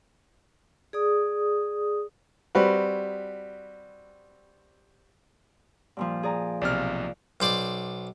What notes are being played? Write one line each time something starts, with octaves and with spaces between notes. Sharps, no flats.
G#4 D5 D#6
G3 C4 F#4 B4
G2 A#2 F3
G#4 D5 A#5
B1 C3 D5 F6
B1 C5 D5